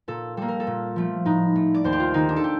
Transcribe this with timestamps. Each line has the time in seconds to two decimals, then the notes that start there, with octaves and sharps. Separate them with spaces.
0.08 A#2 A4
0.37 G3 A#3 A4
0.48 A#4
0.60 A4
0.67 A#2
0.96 F3 A3
1.25 A2 D#4
1.56 A3
1.74 D5
1.84 D#2 C5
1.93 G4
2.00 F4
2.14 D#3 A#3 D#4
2.29 D4
2.36 A4
2.44 G4